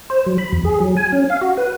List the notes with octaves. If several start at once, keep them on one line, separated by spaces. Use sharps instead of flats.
C5
F#3
B5
E2
G#4
F#3
G#5
C#4
F5
F#4
B4